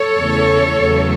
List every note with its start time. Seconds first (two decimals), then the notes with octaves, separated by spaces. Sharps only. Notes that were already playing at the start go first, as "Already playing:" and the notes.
Already playing: A4 C#5
0.17 E2 C#3 E3 A3
0.81 E2 C#3 F#3 A3